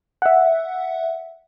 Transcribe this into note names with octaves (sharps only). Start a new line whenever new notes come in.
E5 F#5